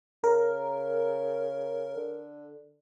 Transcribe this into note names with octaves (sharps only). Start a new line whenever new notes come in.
C#3 A#4
D3